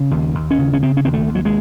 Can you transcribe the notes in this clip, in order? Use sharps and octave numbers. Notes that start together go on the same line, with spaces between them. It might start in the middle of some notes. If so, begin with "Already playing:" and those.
Already playing: C#3
D#2
D#2
C#4
C#3
C#4
C#3 C4
C#4
D#2 C4
A3
D#2
F#3
G#3